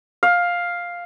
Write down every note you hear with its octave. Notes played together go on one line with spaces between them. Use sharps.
F5